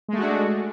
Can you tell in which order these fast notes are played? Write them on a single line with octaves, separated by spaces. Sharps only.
G#3 A3 F#4 D4